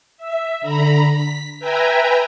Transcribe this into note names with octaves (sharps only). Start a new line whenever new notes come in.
E5
D3 A#5 B5
B6
B4 E5 G5 G#5 A#5